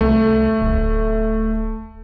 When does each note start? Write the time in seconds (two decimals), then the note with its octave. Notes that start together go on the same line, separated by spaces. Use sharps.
0.01 C2 A3
0.62 D1